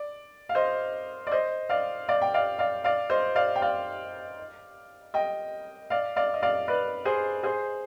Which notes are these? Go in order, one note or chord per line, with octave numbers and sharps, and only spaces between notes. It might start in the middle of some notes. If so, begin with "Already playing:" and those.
Already playing: D5
F5
C5 D#5
D5
C5 D#5
D5 F5
D5 F5
G5
D5 F5
D5 F5
D5 F5
C5 D#5
D5 F5
G5
D5 F5
D#5 G5
D5 F5
D5 F5
D#5
D5 F5
B4 D5
G#4 C5
G#4 C5